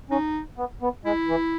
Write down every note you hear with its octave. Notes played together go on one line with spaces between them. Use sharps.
C#4 D#4
B3
B3
G#3 E4
E3